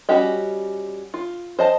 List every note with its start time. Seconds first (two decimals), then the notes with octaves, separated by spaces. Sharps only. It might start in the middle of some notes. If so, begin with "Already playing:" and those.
0.09 G3 C#4 F#4 G4 D#5
1.14 F4
1.59 C5 D#5 A5